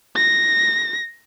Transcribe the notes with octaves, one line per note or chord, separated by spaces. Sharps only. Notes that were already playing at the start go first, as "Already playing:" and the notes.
A#6